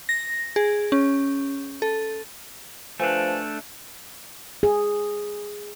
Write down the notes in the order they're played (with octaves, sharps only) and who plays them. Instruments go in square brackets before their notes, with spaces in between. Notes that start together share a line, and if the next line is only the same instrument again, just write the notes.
[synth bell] A#6
G#4
C#4
A4
[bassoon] F3 [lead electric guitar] A3 D4 [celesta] B4 G#5
[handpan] G#4